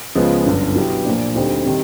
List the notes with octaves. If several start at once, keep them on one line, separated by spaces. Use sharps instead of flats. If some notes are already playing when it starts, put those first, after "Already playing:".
C#2 C#3 F3 G#3 B3
G1 F#2 D3
B2 F#3 B3 E4 G4
A#2 F3 A#3 D4
D2 D3 G3 C4 D#4
C3 D#3 G3